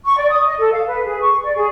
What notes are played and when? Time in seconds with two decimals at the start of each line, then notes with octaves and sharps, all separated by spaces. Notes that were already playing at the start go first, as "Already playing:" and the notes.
0.04 C#6
0.17 D5
0.29 D#6
0.46 D#5
0.58 A4
0.72 F5
0.86 B4
1.04 G#4
1.21 C#6
1.43 D5
1.55 G#4